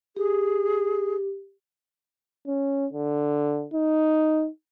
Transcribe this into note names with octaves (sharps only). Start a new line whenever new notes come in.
G4 G#4
C#4
D3
D#4